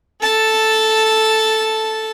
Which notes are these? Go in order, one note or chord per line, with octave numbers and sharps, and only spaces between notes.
A4 A5